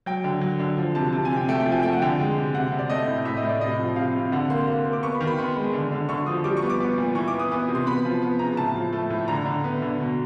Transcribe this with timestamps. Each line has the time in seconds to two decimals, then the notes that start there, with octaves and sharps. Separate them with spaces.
0.06 F#3 G5
0.24 D3
0.41 F#3
0.60 D3
0.78 F3
0.95 C3 A5
1.13 C3 A5
1.25 G#5
1.31 C3 G5
1.49 A3 G5
1.60 G5
1.66 F3
1.72 G#5
1.83 A3 G5
1.93 F#5
2.02 D3 G5
2.20 G#3
2.36 C3
2.54 C3 F#5
2.72 C3
2.79 D5
2.90 A3 D#5
3.07 A2
3.25 A2 E5
3.37 D#5
3.43 A2
3.49 D5
3.61 C3 D#5
3.79 F3
3.96 C3 F5
4.15 C3
4.32 D3 F#5
4.50 A#3 C6
4.68 A#3
4.85 A#3
4.93 D6
5.03 B3 C#6
5.15 B5
5.21 D#3
5.27 B5
5.38 B3 C6
5.57 G#3
5.73 D3
5.92 D3
6.09 D3 C#6
6.26 F3 D#6
6.44 G3 D6
6.57 C#6
6.62 B3
6.70 D6
6.80 B3
6.98 A#2
7.15 E3 C#6
7.28 D6
7.34 B3
7.39 D#6
7.52 B3 D#6
7.68 C3
7.75 C6
7.86 B3 B5
8.05 F3
8.22 B3
8.39 C#3 A#5
8.57 A2 A5
8.75 F3
8.93 A3
9.10 A2
9.28 D3 A#5
9.46 D3
9.64 B3
9.82 D3
10.00 B2